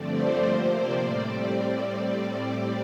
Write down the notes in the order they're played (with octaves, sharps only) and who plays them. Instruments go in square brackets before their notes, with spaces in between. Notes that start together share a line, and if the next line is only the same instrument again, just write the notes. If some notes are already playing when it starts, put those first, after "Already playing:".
Already playing: [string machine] G2 D3 F3 A3 C4 D5
C5
C3 F3 A#3
D5
A2 G3 C4